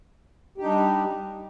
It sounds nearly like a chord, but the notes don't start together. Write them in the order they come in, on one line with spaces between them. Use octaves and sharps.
G4 D#4 D4 G3